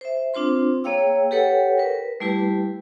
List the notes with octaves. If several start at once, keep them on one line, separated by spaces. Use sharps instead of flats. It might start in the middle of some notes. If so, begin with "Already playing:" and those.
C5 E5
C4 D4 F4 C5 C6
A#3 G#4 C#5 F5 G5 E6
G4 A4 B4 C#5 F#5 G5
A#4 B4
G3 A3 E4 G4 B4